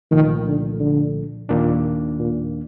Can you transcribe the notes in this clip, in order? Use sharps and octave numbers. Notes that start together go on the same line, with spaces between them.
C2 A#2 D#3 F3 A3
D3
D3
D#2 A#2 D#3 A#3 D4
A#2